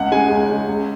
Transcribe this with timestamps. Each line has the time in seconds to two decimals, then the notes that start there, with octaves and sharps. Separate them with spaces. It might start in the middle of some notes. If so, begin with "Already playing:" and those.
Already playing: C#2 F#5
0.12 C#3 G#3 G#5
0.30 C#2
0.49 C#3 G#3
0.68 C#2